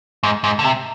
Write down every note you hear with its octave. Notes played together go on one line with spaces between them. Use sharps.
G#2
G#2
D3
C3